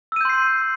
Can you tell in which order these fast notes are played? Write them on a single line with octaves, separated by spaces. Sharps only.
E6 D#7 G6 C6 C7